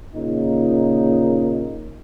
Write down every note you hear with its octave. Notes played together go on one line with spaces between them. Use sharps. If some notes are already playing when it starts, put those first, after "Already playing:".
A#2 C#3 D#4